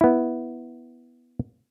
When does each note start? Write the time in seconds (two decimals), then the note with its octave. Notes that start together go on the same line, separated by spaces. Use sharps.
0.01 B3 E4